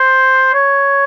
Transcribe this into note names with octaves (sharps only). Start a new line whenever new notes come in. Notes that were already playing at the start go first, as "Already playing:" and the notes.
Already playing: C5
C#5